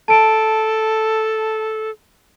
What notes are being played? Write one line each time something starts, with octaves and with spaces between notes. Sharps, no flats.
A4 A5 D7